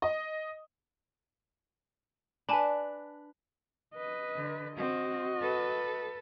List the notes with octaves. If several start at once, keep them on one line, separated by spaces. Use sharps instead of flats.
D#5
D4 B4 G#5 A5 B5
B4 D#5
D3
C4 F#4 D#5
A4 B4